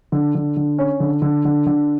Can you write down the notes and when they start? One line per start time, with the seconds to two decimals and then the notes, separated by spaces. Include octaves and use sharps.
0.12 D3
0.35 D3
0.57 D3
0.78 C#4
1.00 D3
1.22 D3
1.45 D3
1.66 D3